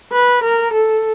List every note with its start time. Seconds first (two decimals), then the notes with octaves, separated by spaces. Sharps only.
0.12 B4
0.43 A#4
0.73 A4